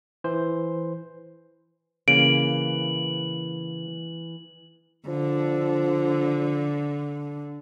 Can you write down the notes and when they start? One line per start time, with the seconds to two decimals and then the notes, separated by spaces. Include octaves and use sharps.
0.24 E3 C5
2.08 C#3 E3 A#3 D7 F#7
5.08 D3 F3